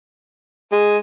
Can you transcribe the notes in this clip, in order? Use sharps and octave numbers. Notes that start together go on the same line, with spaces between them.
G#3